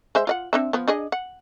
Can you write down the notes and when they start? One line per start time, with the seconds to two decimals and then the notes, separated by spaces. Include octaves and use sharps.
0.15 G#3 C5 E5
0.27 F4 D5 F#5
0.53 C4 D4 E5
0.73 F3 B3
0.88 D4 G#4 D#5
1.12 F#5